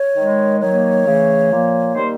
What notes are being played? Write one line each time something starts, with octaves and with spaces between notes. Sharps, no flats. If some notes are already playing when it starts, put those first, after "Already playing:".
Already playing: C#5
D#3 G#3
D#3 F#3 A#3 C#5
C#3 E3 A3
A#2 F3 A#3
D#3 G3 A#3 C5